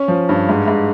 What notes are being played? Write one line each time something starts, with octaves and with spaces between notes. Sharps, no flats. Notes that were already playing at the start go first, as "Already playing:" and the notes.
Already playing: C#4
F3
G2
G#2
G#2